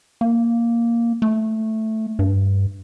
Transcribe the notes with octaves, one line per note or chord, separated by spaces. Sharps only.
A#3
A3
G2